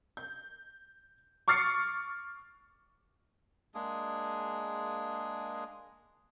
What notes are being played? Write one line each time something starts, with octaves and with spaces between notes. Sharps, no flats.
G6
C#6 D6 F6 A6 C7 C#7
G#3 A#3 D4 G#4